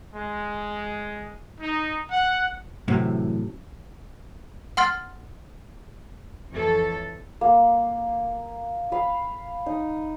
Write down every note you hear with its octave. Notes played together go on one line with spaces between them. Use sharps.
G#3
D#4
F#5
F#2 A2 C3 E3
F#5 C6 F6 A6
F2 E3 A4 C#5
A#3
F5 B5
D#4